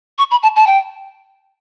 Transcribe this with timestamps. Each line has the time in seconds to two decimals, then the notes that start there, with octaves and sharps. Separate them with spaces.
0.18 C#6
0.31 B5
0.43 A5
0.56 A5
0.67 G5